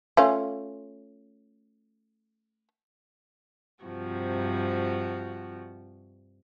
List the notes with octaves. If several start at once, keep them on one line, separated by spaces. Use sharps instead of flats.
A3 C#4 F4
G2 C3 F3 F#4